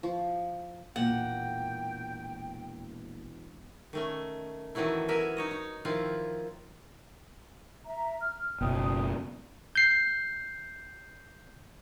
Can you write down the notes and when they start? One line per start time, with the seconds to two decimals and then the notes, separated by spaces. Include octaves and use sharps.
0.03 F3
0.96 E1 A#2 F#5 G5
3.93 D#3 A3 C#4
4.75 D#3 E3 F#3 A3 E4
5.08 B3 A#4 E5 G#5
5.37 D#4 C#5 D#5
5.51 D#4
5.85 D#3 F3 E4 F4
7.86 E5 A#5
8.20 F6
8.61 F#1 B2 G5 D#6
9.75 G6 C7